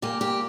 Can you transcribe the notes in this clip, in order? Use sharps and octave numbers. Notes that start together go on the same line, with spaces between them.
A#2 A#3 G4
G4